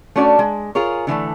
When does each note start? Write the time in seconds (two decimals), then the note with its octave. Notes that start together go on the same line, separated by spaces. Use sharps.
0.16 A3 C#4 D4 F#4 D5
0.39 G#3
0.75 F4 G#4 A#4 C#5
1.07 D3 E3 G#3 A3